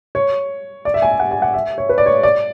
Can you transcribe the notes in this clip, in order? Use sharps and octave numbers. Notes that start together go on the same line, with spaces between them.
C#5
D5
E5
G#5
E5
F#5
G#5
F#5
E5
C#5
B4
D5
C#5
D5